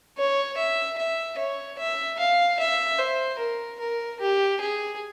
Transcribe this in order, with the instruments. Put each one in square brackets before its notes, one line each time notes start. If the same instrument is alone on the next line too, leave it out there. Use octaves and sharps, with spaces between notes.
[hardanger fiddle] C#5
E5
E5
C#5
E5
F5
E5
C5
A#4
A#4
G4
G#4